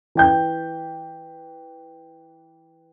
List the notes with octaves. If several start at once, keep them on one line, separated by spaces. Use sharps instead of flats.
E3 G5 G6